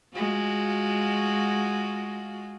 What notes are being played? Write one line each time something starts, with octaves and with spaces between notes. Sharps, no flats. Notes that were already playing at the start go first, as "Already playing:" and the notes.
G#3 F4 F#4